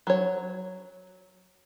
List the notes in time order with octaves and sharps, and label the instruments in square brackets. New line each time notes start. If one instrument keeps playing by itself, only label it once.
[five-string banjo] F#3 C#5